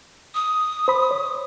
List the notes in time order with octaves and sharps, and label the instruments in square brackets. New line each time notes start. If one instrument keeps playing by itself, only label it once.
[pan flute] D#6
[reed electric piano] C5 B5
C#5